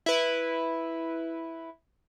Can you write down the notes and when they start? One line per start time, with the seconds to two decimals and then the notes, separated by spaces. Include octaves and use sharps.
0.06 E4 B4